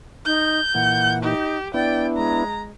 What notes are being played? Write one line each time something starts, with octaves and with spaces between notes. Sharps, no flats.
D#4 G6
A#2 E3 F#5
D#4 G4
B3 D4 E4 D5 G5
G#3 A#5